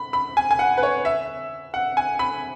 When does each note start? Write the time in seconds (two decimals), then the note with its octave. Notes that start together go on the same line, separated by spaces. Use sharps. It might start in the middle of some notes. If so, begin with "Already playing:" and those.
Already playing: B5
0.13 B5
0.37 G#5
0.51 G#5
0.59 F#5
0.77 B4
0.83 C#5
1.05 E5
1.74 F#5
1.97 G#5
2.19 B5